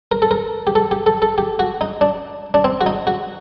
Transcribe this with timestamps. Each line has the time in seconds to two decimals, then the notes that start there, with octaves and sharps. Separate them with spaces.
0.12 A#4
0.22 A4
0.31 A#4
0.67 G4
0.75 A4
0.91 G4
1.06 A4
1.22 A4
1.38 G4
1.59 F#4
1.81 D#4
2.01 D4
2.54 D4
2.64 C4
2.81 F#4
2.86 D#4
3.07 F#4